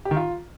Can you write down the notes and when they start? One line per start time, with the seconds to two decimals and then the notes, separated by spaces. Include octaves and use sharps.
0.05 G4
0.11 D#3
0.16 F4